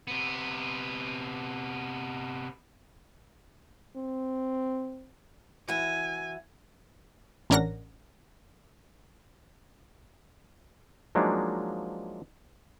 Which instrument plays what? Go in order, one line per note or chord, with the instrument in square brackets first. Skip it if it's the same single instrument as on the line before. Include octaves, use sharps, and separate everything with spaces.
[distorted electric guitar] C3 B3
[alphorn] C4
[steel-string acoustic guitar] E3 F#4 E5 [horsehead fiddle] G#5
[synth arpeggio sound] A1 C#4 D4 A#4 F#5 A#6
[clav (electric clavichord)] F3 F#3 G#3 A#3 D4 D#4